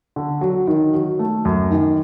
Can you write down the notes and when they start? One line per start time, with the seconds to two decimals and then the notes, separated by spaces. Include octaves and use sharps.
0.16 D3
0.41 F#3
0.68 D#3
0.94 F#3
1.19 A3
1.45 F#2
1.71 D#3